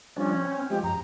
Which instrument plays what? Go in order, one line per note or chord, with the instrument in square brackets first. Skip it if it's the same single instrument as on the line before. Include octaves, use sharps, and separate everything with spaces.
[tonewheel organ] F3 G3 D4 [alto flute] C#4
[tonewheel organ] C4
[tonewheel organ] F3 G#3 [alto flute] G4
[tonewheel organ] F#2 [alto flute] A#5